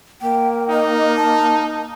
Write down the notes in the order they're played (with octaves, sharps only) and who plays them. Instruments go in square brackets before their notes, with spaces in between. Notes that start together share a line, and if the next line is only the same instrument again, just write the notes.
[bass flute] A#3 [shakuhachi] G5
[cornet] D#4 [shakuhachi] D#5
[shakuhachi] A5